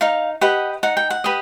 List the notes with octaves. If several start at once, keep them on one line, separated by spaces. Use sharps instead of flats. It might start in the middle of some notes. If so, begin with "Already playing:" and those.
D#4 F5
G4 B4 D#5 F#5
D#4 F#5
G5
F#5
G4 B4 D#5